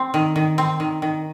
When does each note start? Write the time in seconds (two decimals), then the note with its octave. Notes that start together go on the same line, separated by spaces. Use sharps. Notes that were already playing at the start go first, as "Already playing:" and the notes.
Already playing: C4
0.14 D#3
0.36 D#3
0.58 C4
0.80 D#3
1.02 D#3